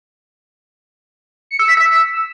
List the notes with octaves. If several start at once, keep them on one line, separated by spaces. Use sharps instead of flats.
C#7
E6
B6
E6